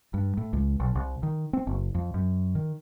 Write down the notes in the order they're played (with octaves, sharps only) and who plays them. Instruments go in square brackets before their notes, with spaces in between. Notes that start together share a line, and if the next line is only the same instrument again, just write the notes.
[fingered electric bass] G2
A2
C#2
B1
C2
D#3
C4
F#1
F2
F#2
D#3